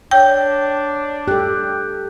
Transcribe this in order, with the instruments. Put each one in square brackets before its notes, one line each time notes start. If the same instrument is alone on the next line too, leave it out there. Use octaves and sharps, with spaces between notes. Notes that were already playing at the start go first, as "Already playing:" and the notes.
[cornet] D4 [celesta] C#5 G6 [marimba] G5
[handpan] G4 A4 [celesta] F#6